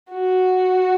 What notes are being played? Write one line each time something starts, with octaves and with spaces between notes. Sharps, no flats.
F#4